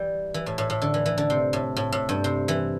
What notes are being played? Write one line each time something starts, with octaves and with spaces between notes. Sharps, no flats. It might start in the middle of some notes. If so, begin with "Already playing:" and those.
Already playing: E3 G3
E3
A2
A2
A2
D3
E3
E3
D3
C3
A2
A2
A2
G2
C3
E3